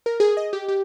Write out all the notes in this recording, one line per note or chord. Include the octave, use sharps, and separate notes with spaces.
A#4
G#4
D#5
G4
G4